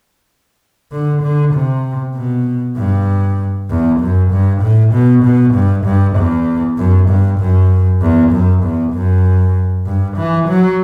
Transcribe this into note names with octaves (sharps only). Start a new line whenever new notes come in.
D3
D3
C3
B2
G2
E2
F#2
G2
A2
B2
B2
G2
G2
E2
F#2
G2
F#2
E2
F#2
E2
F#2
G2
E3
F#3